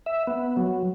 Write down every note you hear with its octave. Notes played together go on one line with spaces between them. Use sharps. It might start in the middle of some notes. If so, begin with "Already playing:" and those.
E5
B3
F#3